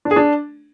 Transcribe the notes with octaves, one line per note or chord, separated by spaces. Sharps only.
D4
G#4
D4